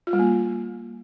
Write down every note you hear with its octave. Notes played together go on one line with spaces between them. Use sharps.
F4
G3
A#3